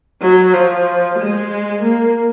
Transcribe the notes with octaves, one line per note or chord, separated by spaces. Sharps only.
F#3
F3
G#3
A#3